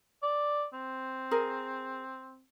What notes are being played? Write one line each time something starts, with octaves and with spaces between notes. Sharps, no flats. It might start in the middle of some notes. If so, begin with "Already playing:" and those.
D5
C4
G#4 A#4